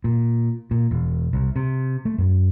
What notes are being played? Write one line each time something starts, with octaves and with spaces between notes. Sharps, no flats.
A#2
A#2
E1
C2
C3
A3
F#2